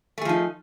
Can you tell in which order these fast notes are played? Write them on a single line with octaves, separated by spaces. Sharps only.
A3 G#4 F3 D#4